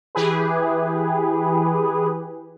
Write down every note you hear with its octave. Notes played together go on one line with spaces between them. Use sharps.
E3 G4 G#4 B4